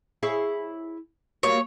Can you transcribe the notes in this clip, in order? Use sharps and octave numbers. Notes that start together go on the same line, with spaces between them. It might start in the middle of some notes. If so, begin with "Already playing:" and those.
E4 G#4 C#5
F#3 G3 A#3 C#5